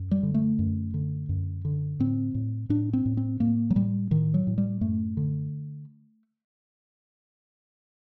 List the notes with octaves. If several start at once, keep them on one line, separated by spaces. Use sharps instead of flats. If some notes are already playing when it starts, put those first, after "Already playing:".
Already playing: F#2
G3
D3
A3
F#2
D3
F#2
D3
A2 C4
A2
A2 D4
C4
A2
C4
A2 A#3
F#3
A2 G3
A2 D#3
F#3
A2
G3
F#2 A3
D3